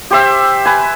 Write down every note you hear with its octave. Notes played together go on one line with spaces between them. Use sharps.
G4 C5 E5
B4 G#5